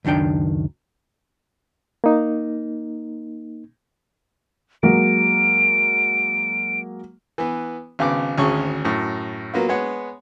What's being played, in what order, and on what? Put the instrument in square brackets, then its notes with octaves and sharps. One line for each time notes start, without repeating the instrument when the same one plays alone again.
[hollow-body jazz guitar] C#2 F#2 D#3 D4 G5
[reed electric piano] A#3 D#4
[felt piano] F#3 G#3 A#3 [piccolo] D7
[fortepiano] E3 B3
G#1 C#3 B3 D6
G#1 D2 C#4 G#4 C#6
F#2 A2
F#3 A#3 B3 F4
G#3 B3 C#5 F#5